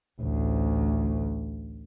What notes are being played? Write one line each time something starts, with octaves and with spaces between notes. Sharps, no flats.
A1 D2